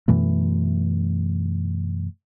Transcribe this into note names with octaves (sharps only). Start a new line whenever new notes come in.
F#2 B2 E3 A3